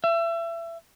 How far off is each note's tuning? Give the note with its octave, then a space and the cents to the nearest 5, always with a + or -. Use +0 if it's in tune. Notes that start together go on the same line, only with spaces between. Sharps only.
E5 +30